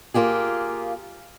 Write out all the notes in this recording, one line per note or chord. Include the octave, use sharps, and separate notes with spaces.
A#3 F4 G4 G#4